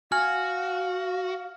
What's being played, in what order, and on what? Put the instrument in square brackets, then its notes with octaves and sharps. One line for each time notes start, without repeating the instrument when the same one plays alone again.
[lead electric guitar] F#4 [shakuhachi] F5 [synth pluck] G#5 [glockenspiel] F6